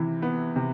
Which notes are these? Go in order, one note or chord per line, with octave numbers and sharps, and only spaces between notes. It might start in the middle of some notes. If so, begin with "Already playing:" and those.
Already playing: C3 E3 E4
B3
C3